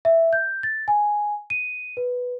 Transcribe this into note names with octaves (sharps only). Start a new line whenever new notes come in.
E5
G6
A6
G#5
D#7
B4